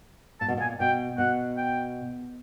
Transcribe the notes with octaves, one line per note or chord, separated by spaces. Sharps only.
A#2 A5
B2
A#2 G#5
B2 G5
B2 F#5
G5